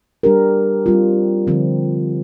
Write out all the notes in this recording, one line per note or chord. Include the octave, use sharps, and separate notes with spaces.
G3 D4 G4 A#4
G3 C4 F4
D3 F3 C4